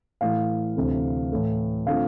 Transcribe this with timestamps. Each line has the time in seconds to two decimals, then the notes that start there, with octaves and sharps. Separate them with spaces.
0.21 A2 E3 A3 F5
0.76 D2 C3 E3 A3 C4
1.32 A2 E3 A3
1.87 D3 A3 C4 F4 F5